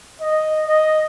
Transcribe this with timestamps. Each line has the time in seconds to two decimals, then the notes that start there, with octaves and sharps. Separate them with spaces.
0.21 D#5
0.67 D#5